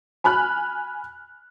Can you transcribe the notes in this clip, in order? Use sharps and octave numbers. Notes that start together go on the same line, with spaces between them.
G#5 B5 F6 F#6